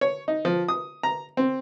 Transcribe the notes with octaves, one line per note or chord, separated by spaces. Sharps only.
C#5
D#4
F3
D#6
A#5
C4